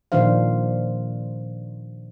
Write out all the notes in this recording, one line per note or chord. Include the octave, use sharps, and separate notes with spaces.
A#2 D#3 F3 D4 C5 F5